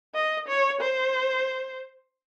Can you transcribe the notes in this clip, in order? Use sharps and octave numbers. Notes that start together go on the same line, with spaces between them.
D#5
C#5
C5